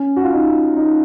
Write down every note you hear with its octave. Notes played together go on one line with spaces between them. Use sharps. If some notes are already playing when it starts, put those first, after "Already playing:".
Already playing: C#4
F#4
F4
D#4
D#4